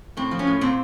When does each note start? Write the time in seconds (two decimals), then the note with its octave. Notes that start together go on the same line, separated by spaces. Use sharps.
0.17 A2 C4
0.31 F3
0.39 C#4
0.47 A2
0.61 A#2 C4